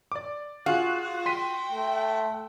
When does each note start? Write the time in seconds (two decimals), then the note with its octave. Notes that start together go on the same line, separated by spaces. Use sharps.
0.12 D5 D6
0.66 F4 F#4 G#4 F5 F#6
1.26 G5 C6 B6 D#7
1.72 A3